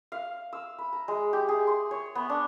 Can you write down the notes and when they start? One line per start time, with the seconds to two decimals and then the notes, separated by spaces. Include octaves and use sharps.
0.12 F5
0.53 E6
0.78 B5
0.93 A#5
1.08 G#3
1.33 G4
1.49 G#4
1.67 C6
1.91 C#5
2.15 B3
2.30 D4